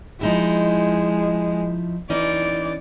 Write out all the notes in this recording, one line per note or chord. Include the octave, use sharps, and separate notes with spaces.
F3 G#3 D#4 E4
E3 C#4 D#4 D5